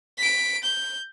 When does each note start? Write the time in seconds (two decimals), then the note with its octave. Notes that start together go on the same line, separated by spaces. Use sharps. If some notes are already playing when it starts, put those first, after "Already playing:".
0.18 B6 D7
0.63 G6